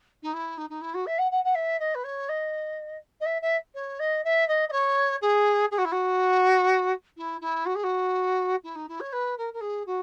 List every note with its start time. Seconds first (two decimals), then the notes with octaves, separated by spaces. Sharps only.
0.23 D#4
0.34 E4
0.57 D#4
0.70 D#4
0.81 E4
0.94 F#4
1.06 E5
1.19 F#5
1.31 F#5
1.44 F#5
1.55 E5
1.80 D#5
1.95 B4
2.04 C#5
2.29 D#5
3.21 D#5
3.26 E5
3.42 E5
3.75 C#5
4.00 D#5
4.24 E5
4.48 D#5
4.69 D#5
4.72 C#5
5.22 G#4
5.71 G#4
5.78 F#4
5.85 E4
5.92 F#4
7.17 E4
7.41 E4
7.66 F#4
7.75 G#4
7.84 F#4
8.64 E4
8.75 D#4
8.89 E4
9.00 C#5
9.13 B4
9.38 A#4
9.53 A#4
9.61 G#4
9.86 F#4